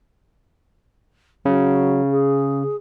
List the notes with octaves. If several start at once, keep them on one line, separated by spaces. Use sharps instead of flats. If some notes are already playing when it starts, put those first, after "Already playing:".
C#3 F#3
G#4